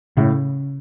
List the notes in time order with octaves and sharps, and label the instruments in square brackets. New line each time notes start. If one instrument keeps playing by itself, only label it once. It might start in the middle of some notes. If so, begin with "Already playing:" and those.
[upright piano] A2 [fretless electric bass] C#3